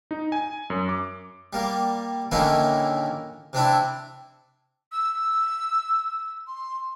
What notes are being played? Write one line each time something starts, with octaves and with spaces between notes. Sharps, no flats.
D#4
G#5
F#2
D6
G3 A#3
A#2 D3 D#3 A#3 C#4 E4
C3 C4 D4 E4
E6
C6